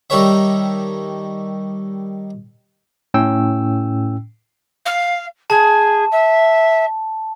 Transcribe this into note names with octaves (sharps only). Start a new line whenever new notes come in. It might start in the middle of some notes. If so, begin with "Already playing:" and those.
D#3 G3 A4 A#4 C#5 E5
A2 C#4 G5 E6
F5
G#4 A5
E5